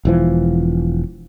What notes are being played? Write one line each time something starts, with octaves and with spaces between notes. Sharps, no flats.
E1 E3 F3